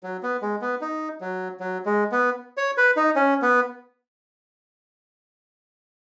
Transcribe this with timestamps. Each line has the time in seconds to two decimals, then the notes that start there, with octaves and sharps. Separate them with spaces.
0.03 F#3
0.23 B3
0.42 G#3
0.61 B3
0.81 D#4
1.21 F#3
1.60 F#3
1.86 G#3
2.12 B3
2.57 C#5
2.77 B4
2.96 D#4
3.16 C#4
3.42 B3